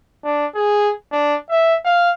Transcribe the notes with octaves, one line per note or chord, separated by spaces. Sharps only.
D4
G#4
D4
E5
F5